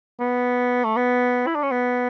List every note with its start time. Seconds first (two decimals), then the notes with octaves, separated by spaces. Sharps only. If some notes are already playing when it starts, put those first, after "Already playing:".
0.20 B3
0.84 A3
0.96 B3
1.47 E4
1.55 D4
1.63 C#4
1.71 B3